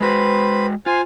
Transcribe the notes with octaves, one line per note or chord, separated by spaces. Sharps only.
G#3 F#4 B4 C5 B5
F4 C5 G#5